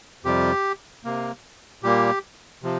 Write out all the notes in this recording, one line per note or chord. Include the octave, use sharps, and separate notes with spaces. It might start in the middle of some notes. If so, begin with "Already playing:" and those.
F2 C3 G3 G4
C3 A#3
A#2 G3 A#3 G4
C3 F3